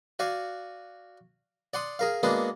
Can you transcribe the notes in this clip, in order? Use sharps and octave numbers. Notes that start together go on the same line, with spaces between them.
F#4 D5 F5 G#5
D5 F#5 C6 D#6
G#4 A#4 F5
G#3 A#3 B3 D4 F#4 G#4